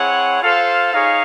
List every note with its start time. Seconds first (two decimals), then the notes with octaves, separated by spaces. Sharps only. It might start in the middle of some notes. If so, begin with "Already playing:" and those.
Already playing: C4 E4 G#4 C#5 F#5
0.40 F4 A4 C5 F5
0.92 D#4 G#4 C#5 F5